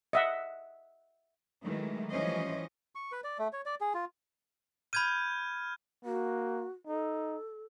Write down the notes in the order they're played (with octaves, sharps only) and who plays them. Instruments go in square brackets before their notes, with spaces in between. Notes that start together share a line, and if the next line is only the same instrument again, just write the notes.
[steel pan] D#5 E5 F#5
[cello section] D#3 E3 F#3 G#3 A3
E3 F3 G3 C#4 C5 D#5
[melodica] C#6
B4
D5
A3
C#5
D5
G#4
F4
[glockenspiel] B5 G#6 D#7 [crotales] F6 G6
[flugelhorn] A#3 [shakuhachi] F#4
[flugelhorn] D#4 [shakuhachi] A4